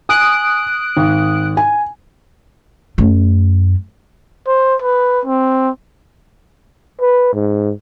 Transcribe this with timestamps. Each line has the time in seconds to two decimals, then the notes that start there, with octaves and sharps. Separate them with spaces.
0.09 G#5 D#6 F#6 D7
0.97 G#1
1.57 G#5
2.98 F#2 A3
4.47 C5
4.82 B4
5.25 C4
7.01 B4
7.34 G#2